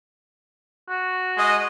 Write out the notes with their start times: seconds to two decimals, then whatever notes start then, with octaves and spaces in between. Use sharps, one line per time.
0.89 F#4
1.37 G#3 D#5